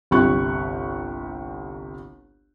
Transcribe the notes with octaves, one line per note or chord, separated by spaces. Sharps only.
G1 C2 G4 C#6 F#6